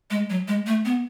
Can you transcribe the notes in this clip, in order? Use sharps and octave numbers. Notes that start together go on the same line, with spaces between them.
G#3
F#3
G#3
A3
B3